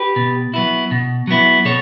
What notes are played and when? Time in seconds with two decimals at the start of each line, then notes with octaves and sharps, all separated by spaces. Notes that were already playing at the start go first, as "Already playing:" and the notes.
Already playing: G4 B4
0.16 B2
0.54 F#3 B3 E4
0.91 B2
1.27 F#3 B3 E4
1.65 B2 A4 C#5